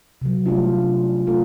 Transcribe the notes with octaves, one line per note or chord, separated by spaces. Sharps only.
C3 F#3
G3 A3 C#4 D4 E4 F4
A3 F4 A4